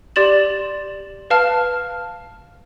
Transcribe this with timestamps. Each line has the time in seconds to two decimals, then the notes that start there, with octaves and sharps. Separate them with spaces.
0.16 G4 D5 C6 A6 E7 F#7
1.30 B4 F5 A5 F6